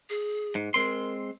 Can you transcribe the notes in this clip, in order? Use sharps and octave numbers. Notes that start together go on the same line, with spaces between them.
G#4
G#2
G#3 C4 A#4 C6